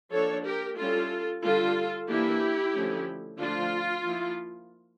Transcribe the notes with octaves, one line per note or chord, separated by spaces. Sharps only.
F3 A#3 D4 A4 C#5
G4 A#4
G3 C#4 E4 F4 A4
D3 G3 D4 F4 A4
E3 A#3 D4 E4 G4
D3 F3 A3 C#4
D3 F3 A3 D4 F4
F3 A#3 E4